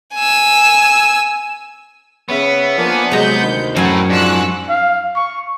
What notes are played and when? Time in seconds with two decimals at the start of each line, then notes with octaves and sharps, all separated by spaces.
0.15 G#5 E6
2.30 C#3 B3 C#5 E5
2.77 F3 A#3 D4 D5 G#5
3.11 C3 F#3 G#3 A#5 G6
3.41 D2 D#3
3.76 F#2 A2 A#4 F#5 G#5
4.10 G#2 F3 D4 C#6 E6 F#6
4.69 F5
5.16 C#6